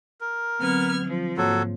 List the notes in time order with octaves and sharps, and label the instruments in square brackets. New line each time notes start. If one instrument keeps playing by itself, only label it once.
[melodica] A#4
[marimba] D3 F#3 C4 [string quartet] B3 F6 G#6
[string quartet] F3
[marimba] G#2 A#3 C#5 [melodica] F#3 A4